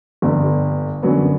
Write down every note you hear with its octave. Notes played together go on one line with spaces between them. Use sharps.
G1 G2 D3
F#2 D3 F#3 B3